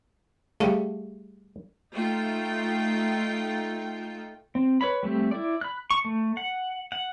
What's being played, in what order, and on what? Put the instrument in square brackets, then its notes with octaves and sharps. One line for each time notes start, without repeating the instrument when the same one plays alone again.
[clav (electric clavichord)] G3 A3 [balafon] G#4 F5
[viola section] A3 D#4 F4 G5
[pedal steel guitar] C4
B4 C#5 B5
G3 A3 C4 G4
E4 D5
B5 F#6
C#6
A3
F#5
F#5